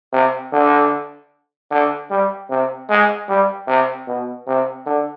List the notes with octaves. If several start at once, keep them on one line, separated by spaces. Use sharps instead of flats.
C3
D3
D3
G3
C3
G#3
G3
C3
B2
C3
D3